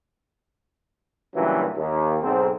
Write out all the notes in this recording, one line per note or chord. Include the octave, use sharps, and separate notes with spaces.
C#2 G2 A#2 E3 F#3 C#4
D#2
B1 G#2 C4